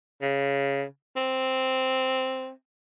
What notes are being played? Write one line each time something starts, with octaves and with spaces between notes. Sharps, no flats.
C#3
C4